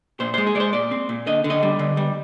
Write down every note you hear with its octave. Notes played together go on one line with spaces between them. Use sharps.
A#2 C5
G#3 C5
G#4
G#3 D5
C5
A#2 D5
C4
A#2
D3 D#5
D3
D#5
G3
D3
G3